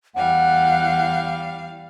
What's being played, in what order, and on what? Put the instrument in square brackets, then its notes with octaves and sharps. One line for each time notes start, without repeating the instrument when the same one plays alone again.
[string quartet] E2 G3 F5 [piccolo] F#5